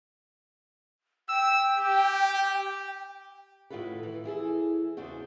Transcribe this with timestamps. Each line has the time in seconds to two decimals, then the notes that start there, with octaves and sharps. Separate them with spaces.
1.29 G5 E6
1.77 G4
3.70 A2 D#3 F4 F#4 A4 B4
4.03 E3
4.24 E3 E4 G#4 A4
4.97 E2 C#3 D4 F#4 C5